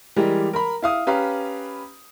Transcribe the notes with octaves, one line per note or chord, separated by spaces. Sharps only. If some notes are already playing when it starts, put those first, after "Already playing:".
E3 G3 G#3 G4 A#4
A#4 A#5 B5
E4 F5 D#6
C#4 G4 B4 F5 A#5 B5